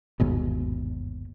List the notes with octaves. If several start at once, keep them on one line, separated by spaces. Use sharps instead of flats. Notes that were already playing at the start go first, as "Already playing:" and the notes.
G1 D#2 G#2 B2